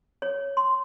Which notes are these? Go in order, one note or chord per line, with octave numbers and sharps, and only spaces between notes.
C#5
C6